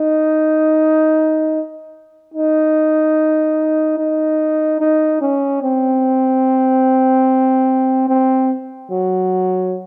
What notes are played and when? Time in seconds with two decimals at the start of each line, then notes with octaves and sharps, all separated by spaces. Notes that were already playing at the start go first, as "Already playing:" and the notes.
Already playing: D#4
2.34 D#4
3.98 D#4
4.80 D#4
5.21 C#4
5.62 C4
8.09 C4
8.91 F#3